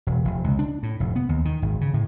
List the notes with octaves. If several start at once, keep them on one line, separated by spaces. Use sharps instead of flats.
E1
F1
C#2
D4
A2
F1
B3
D#2
D#3
G#1
C#3
A2